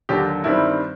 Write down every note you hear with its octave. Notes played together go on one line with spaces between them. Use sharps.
D#2 D3 F#3 G4
G2 D#3 G3 C4 E4